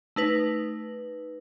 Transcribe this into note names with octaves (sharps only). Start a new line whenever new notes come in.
A3 D#4 B4